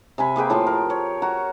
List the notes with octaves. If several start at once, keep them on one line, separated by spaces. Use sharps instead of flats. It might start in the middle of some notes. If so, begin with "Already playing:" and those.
C3 G#5 B5
A#3 G#4 B4 G5
A2 F3 A5 C6
A#4
C#5
F#4 A#5